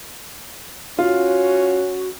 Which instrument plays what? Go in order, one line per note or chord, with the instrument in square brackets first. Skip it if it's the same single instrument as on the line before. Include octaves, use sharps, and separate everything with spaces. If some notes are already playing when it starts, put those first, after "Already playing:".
[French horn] C#4 [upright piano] F4 [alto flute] F#4